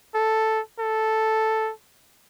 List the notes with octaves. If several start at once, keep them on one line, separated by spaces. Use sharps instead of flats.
A4
A4